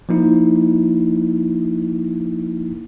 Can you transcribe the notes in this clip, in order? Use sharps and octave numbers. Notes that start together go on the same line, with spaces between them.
F3 A#3 D#4 E4